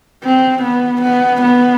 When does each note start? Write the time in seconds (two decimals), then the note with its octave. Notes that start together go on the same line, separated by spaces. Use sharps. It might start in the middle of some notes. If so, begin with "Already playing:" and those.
0.24 C4
0.63 B3
1.02 B3
1.42 B3